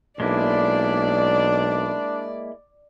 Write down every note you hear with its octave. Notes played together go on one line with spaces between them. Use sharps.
B1 G#3 A#3 D4 E4 D5